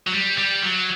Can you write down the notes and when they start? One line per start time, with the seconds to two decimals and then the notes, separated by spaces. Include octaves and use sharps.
0.07 F#3
0.13 G3
0.38 G3
0.62 F#3